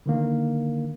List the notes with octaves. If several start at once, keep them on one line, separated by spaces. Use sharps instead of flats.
D3 D#3 A#3